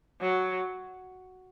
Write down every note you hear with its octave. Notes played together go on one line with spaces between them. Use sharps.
F#3